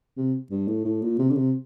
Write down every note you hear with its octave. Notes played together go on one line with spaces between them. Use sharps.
C3
G2
A2
A2
A#2
C3
D3
C3